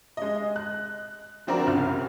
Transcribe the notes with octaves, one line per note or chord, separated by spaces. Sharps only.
G#3 D#5
F#6
D3 F3 C4 D4 F#4 A#4
C2 C#3 F6